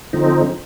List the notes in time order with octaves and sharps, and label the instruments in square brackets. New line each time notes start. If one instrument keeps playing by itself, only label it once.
[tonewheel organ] D3 F3 C4 D#4